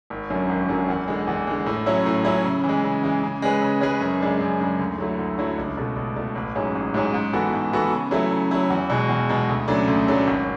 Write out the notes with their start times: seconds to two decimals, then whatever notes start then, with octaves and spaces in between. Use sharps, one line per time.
0.10 G#1
0.30 F#2 D3 F#3
0.49 G#1
0.69 F#2 D3 F#3
0.89 E2
1.08 D3 G#3
1.27 E2
1.47 D3 G#3
1.66 A2
1.86 F#3 C#4 E4
2.06 A2
2.25 F#3 C#4 E4
2.44 C#3
2.64 E3
2.69 G#3
2.84 C#3
3.03 E3 G#3
3.23 C#3
3.42 G#3 C#4 G#4 B4
3.62 C#3
3.81 G#3 C#4 G#4 B4
4.01 F#2
4.21 C#3 G#3 D4
4.41 F#2
4.60 C#3 G#3 D4
4.79 D2
4.98 D3 F#3 A3 E4
5.19 D2
5.38 D3 F#3 A3 E4
5.58 C#2
5.77 B2 A3
5.96 C#2
6.16 B2 A3
6.35 A1
6.55 G#2 F#3 C#4 G#4
6.75 A1
6.94 G#2 F#3 C#4 G#4
7.14 G#2
7.33 E3 B3 F#4 A4
7.53 G#2
7.73 E3 B3 F#4 A4
7.92 C#3
8.11 F#3 A3 E4
8.31 C#3
8.51 F#3 A3 E4
8.70 E2
8.90 B2 G#3
9.09 E2
9.29 B2 G#3
9.49 D2
9.68 C#3 F#3 A3 D4
9.88 D2
10.07 C#3 F#3 A3 D4
10.27 G#1